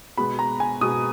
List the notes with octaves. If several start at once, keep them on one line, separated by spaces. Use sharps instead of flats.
B2 G#3 B3 B5
A#5
G#5
B2 G#3 B3 D#6